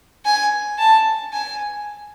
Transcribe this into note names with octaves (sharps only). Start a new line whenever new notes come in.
G#5
A5
G#5